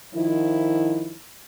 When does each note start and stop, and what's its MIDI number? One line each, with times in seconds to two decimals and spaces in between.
0.15 1.15 51
0.15 1.15 53
0.15 1.15 64